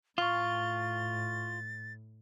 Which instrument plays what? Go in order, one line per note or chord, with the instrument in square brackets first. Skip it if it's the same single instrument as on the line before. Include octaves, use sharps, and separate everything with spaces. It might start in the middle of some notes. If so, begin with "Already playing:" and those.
[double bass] A2 [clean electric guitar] F4 [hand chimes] C#6 F6 [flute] A6